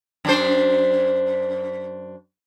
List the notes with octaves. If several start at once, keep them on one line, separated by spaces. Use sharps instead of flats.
F#2 D4 C5